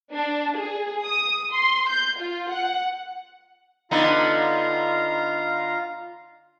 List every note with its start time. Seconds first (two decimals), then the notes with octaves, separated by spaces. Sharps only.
0.13 D4
0.58 G#4
1.04 D#6
1.53 C6
1.89 G6
2.19 F4
2.50 F#5
3.91 D3 B3 D#4 F4 F5 A#5